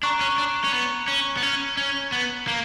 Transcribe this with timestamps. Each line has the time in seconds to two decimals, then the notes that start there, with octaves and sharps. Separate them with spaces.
0.03 D4 A#5 C#6 F#6
0.21 C#4
0.38 D4
0.64 C#4
0.72 B3
1.08 C#4
1.37 B3
1.43 C#4
1.77 C#4
2.12 B3
2.48 A#3